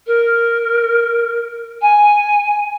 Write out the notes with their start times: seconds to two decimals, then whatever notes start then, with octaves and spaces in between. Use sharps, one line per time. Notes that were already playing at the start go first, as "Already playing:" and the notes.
0.07 A#4
1.82 G#5